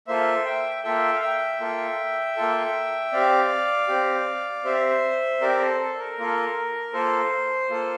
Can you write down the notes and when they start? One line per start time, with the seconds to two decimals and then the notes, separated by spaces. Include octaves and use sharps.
0.07 A#3 F4 A4 C5 E5
0.45 E5 G5
0.83 A#3 F4 A4 E5 G5
1.13 F5
1.21 E5 G5
1.60 A#3 F4 A4
2.37 A#3 F4 A4
3.13 C4 G4 D5 F5
3.88 C4 G4
4.65 C4 G4 C5 E5
5.41 C4 G4 A#4 D5
5.61 A4 C5
5.80 A4
5.99 A#4
6.18 A#3 F4 A4
6.93 A#3 F4 A4 C5
7.70 A#3 F4 A4